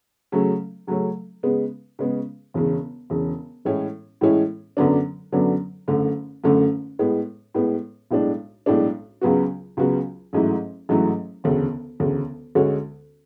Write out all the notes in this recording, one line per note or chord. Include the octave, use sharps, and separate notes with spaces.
C#3 F#3 A3 C#4
C#3 F#3 A3 C#4
C#3 G#3 B3
C#3 G#3 B3
E1 E2 C#3
E1 E2 C#3
A2 E3 G#3 C#4 E4
A2 E3 G#3 C#4 E4
F#2 D3 F#3 B3 D4
F#2 D3 F#3 B3 D4
F#1 F#2 D3 A3
F#1 F#2 D3 A3
A2 G#3 B3
A2 G#3 B3
B1 A2 G#3 D4
B1 A2 G#3 D4
C#2 C#3 F#3 B3 F#4
C#2 C#3 F#3 B3 F#4
A1 G#2 F#3 A3 E4
A1 G#2 F#3 A3 E4
E1 D2 C#3
E1 D2 C#3
D2 D3 G#3 C#4 F#4